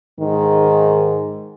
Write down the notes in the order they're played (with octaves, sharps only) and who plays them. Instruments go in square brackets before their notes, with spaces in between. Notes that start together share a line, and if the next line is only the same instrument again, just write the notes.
[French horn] G#2 [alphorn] D#3